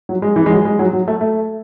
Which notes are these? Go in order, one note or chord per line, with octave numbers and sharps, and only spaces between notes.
F#3
G#3
E3
G#3
F#3
G#3
F#3
F#3
A3
A3